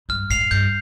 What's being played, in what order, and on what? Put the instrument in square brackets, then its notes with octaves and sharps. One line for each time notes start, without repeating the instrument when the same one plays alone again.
[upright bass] G2 [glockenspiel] F6
[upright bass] A2 [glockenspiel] C7 F7
[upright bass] G2 [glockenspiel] G6